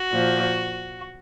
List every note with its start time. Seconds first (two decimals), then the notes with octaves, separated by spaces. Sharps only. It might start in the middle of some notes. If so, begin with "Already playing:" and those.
Already playing: F#4
0.12 A#2 F3